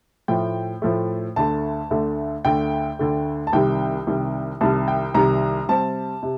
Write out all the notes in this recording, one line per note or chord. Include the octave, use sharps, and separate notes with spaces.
A2 F3 A3 G5
A2 F3 A3
D2 D3 A3 A5
D2 D3 A3
D2 D3 A3 G5
D2 D3 A3
A5
C2 C3 D#3 G3 G5
C2 C3 D#3 G3
C2 C3 D#3 G3 A5
G5
C2 C3 D#3 G3 A#5
C3 G3 C4 A5
C3